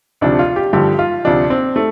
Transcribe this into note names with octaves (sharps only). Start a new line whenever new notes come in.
D2 C3 F3 D4
F4
G4
G2 D3 F3 G4
F4
D2 C3 F3 D4
C4
A3